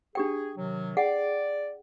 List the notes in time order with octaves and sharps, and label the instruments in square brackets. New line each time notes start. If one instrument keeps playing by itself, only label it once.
[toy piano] D4 G4 G5 [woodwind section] G#4
[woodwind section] C3 D#3 F#3
[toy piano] G#4 F#5 G5 [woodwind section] D5